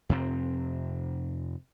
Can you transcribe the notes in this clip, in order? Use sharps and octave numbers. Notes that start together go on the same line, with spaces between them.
F2 C3 C4